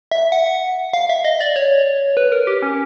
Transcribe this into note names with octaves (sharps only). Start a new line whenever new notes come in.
E5
F#5
F5
E5
D#5
D5
C#5
B4
A#4
G4
C#4